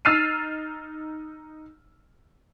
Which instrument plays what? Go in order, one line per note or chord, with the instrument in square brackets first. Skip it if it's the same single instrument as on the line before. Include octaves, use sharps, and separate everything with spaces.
[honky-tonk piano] D#4 E6 F6 A6 C7 D#7